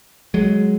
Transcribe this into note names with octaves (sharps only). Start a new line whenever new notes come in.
F#3 G#3